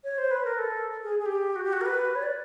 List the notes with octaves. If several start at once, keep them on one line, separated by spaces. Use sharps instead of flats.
C#5
C5
B4
A#4
A4
G#4
G#4
G4
F#4
G4
F#4
A#4
B4
C#5
D5